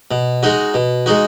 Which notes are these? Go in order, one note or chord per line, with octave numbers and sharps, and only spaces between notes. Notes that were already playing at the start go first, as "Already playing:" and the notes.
B2
G#3 D#4 F#4
B2
G#3 D#4 F#4